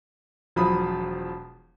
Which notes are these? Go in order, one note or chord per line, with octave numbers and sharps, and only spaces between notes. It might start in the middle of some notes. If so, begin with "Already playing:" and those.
E1 F3 F#3 B5 D#6